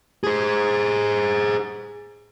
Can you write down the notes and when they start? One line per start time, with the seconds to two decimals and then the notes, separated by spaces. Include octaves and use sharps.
0.24 G#4 C5